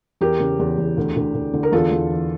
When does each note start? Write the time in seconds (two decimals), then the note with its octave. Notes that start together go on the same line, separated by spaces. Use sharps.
0.21 E2 G4 A#4
0.40 C#3
0.59 E2
0.78 E2
0.97 D2
1.16 D2
1.34 D2
1.54 D3
1.63 A#4
1.72 E2 F4 A4
1.92 E2
2.10 E3